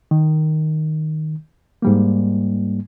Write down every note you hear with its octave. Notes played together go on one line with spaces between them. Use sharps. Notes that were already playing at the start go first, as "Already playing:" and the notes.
D#3
G#2 G3 A#3